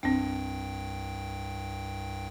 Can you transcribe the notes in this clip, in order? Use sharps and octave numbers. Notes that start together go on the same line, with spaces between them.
C2 G2 C4 D4 G5